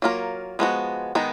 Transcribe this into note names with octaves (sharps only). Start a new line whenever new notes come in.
F#3 A#3 F4 A#4
F3 G#3 B3 F#4
D#3 G#3 B3 D#4